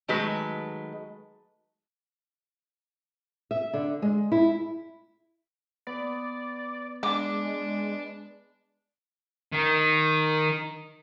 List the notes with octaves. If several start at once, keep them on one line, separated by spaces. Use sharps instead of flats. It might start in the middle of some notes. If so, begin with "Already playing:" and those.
D#3 F#3 G#3 A3 B4
E5
D3
G#3
E4
B3 D5
G#3 D4 D6
D#3